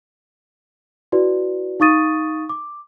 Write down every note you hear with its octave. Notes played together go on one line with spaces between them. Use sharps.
E4 F#4 B4 D5
D#4 F5 C#6 D#6 A6 D#7
D6